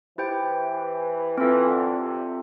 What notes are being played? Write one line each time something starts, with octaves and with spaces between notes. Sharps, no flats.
E3 E4 G4 C5 G5
E3 C4 F4 A4
D3
C3